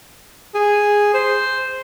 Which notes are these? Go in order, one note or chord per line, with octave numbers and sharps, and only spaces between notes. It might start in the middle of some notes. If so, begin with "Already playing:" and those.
G#4
C5